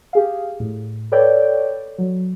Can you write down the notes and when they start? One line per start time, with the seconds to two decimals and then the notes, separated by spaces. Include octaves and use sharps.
0.13 G4 G#4 F5
0.60 A2
1.12 A4 B4 C#5 D5 G5
1.98 F#3